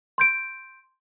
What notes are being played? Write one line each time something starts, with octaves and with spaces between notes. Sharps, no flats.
C6 G6 D7